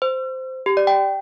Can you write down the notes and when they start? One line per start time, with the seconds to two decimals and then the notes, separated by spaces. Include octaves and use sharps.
0.02 C5
0.66 G4
0.77 D5
0.87 G5